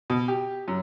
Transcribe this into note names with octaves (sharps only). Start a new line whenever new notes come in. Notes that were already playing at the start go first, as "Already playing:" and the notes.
B2
G4
F#2